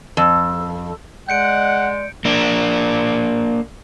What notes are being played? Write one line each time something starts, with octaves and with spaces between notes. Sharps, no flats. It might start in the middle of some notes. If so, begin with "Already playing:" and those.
F2
G#3 D5 F#5 G6 C#7 D7
A#3 D4